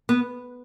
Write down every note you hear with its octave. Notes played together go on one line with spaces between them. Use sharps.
B3